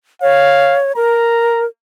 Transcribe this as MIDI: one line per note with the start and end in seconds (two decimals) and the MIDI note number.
0.22 0.92 73
0.22 0.78 77
0.96 1.66 70
0.96 1.63 82